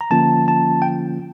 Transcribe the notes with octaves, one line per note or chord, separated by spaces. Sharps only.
A#5
D3 F3 A#3 C#4 F4 A5
A5
G5